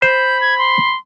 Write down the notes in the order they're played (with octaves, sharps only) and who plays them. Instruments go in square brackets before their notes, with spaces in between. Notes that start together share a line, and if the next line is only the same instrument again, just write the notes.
[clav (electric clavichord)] C5 [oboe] B5 [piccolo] G6
[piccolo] G#6
C6